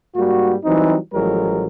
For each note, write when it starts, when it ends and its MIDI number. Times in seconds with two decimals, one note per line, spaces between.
0.15 0.55 44
0.15 0.55 55
0.15 0.55 58
0.15 0.55 66
0.64 0.96 52
0.64 0.96 54
0.64 0.96 55
0.64 0.96 60
0.64 0.96 63
1.13 1.67 33
1.13 1.67 45
1.13 1.67 53
1.13 1.67 54
1.13 1.67 56
1.13 1.67 70